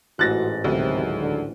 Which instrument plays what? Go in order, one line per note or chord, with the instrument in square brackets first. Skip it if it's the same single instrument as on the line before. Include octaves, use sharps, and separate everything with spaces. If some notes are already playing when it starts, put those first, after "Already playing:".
[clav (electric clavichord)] A1 G#2 A4 [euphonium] F#4 [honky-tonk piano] F#6 A6 A#6
[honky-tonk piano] D2 [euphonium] C3 [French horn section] D#3 F#3 G#3
[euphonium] D3